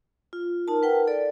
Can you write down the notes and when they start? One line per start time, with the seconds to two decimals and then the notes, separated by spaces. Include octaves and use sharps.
0.33 F4
0.68 D#4 A#4 A5
0.83 B4 F#5 G5
1.07 A4 D5